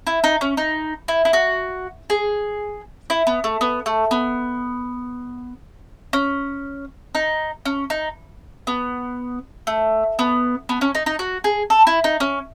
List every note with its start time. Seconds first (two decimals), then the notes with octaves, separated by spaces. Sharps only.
0.07 E4
0.24 D#4
0.41 C#4
0.57 D#4
1.08 E4
1.25 E4
1.33 F#4
2.10 G#4
3.10 E4
3.27 B3
3.44 A3
3.61 B3
3.86 A3
4.11 B3
6.13 C#4
7.15 D#4
7.65 C#4
7.90 D#4
8.67 B3
9.67 A3
10.19 B3
10.69 B3
10.81 C#4
10.95 D#4
11.06 D#4
11.19 F#4
11.44 G#4
11.70 A4
11.87 E4
12.04 D#4
12.20 C#4